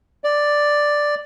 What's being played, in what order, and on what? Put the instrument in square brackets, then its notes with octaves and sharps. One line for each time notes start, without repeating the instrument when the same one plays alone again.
[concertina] D5